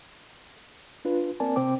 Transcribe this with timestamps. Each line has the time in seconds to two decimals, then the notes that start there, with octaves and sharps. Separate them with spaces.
1.05 D4 F4 B4
1.40 A#3 C4 A#4 D5 G#5 A5
1.56 C3 C4 C5 G5 D6